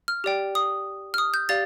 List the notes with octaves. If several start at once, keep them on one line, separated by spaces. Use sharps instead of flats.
F6
G4 D5 G5
D#6
F6
D#6
G6
G4 D5 F5 A6